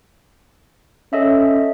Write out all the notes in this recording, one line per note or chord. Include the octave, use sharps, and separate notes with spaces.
C#4 A4 D#5 E5